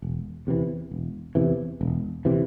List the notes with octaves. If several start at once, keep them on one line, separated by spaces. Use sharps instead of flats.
E1
E2 C3 E3
E1
E2 C3 E3
E1
C3 E3